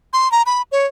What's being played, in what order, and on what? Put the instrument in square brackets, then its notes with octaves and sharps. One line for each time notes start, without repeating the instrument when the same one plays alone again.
[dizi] C6
A#5
B5
C#5